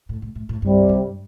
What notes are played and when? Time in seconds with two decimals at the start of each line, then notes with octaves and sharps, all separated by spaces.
0.09 A2
0.22 A2
0.35 A2
0.49 A2
0.62 C2 G2 C3 G3
0.89 G2